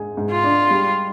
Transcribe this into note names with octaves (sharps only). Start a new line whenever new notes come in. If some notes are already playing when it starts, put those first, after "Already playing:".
Already playing: G#2 G#4
G#2
F4
D4
G3